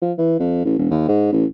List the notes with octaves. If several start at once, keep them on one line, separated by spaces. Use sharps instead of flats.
F3
E3
F2
A1
E1
D#2
G#2
A1